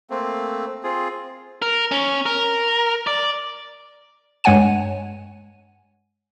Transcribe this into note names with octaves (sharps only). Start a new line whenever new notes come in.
A3 A#3 C4
C4 F4 G#4
A#4
C#4
A#4
D5
G2 G#3 C#5 F#5 G#5 D#7